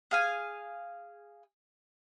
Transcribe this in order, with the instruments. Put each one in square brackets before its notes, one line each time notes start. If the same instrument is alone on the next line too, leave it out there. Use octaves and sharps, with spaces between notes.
[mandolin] G#4 F5 G#5